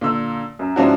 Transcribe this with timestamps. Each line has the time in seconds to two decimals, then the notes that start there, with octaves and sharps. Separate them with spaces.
0.01 A#2 D3 E6
0.59 F#2
0.76 G#2 F3 C#4 D4 E4 F#4